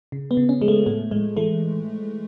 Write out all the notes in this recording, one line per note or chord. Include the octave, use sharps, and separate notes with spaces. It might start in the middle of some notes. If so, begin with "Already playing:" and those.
C#3
B3
C#3
C#4
F3 G#3
A3
A2 A3
A2 G#3
E3 A3